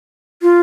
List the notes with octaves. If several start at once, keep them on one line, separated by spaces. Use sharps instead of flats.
F4